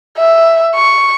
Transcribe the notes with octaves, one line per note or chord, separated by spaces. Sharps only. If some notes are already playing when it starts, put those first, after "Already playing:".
E5
C#6